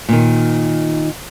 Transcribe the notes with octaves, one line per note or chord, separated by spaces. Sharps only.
A#2 D#3